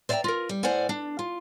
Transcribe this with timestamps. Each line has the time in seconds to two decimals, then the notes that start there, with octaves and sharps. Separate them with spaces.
0.09 C5 D5 E5 F5 G5 A#5
0.24 F4 A#4
0.49 G3
0.63 A2 C5 D5 F5 F#5 G#5
0.89 D4
1.19 F4